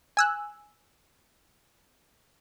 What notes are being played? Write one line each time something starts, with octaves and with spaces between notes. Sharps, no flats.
G#5 E6 F#6